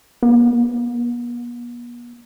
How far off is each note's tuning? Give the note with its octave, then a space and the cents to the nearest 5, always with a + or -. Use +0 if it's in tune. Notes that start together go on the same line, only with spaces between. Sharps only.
B3 -45